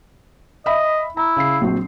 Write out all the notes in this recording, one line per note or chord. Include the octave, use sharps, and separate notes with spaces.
D#5 E5 B5
E4 A#5
C#3 C7
A#1 F#3 C4